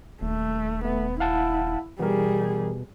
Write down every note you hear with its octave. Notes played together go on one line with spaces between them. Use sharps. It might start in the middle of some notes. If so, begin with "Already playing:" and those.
D#1 A3
A3 B3
E4 F5 F#5 A5
B2 E3 G3 G#4 A#4